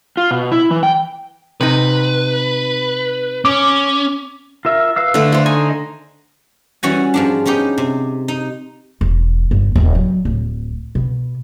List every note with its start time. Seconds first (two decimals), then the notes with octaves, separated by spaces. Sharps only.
0.17 F4
0.31 B2
0.52 E4
0.71 E3
0.83 G5
1.61 C3 D#4 B4
3.45 C#4 D6
4.65 F4 A#4 E5
4.96 B4 F5 E6
5.14 D3 A3
5.32 A3 C5
5.46 D#4 G#5
6.83 E3 G3 C#4 F#4 F#5 G#5
7.14 G#2 F3 D4
7.46 B3 C#4 D#4 G4
7.78 C3
8.28 D#4
9.01 E1
9.51 G1
9.76 D#1
9.95 F#3
10.25 D1
10.95 B2